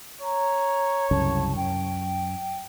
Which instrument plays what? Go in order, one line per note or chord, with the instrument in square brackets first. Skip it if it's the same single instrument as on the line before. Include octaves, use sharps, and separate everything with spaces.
[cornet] C#5 [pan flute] A#5
[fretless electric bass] C2 F#2 C#3 [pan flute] A5
[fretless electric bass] F#2 [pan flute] G5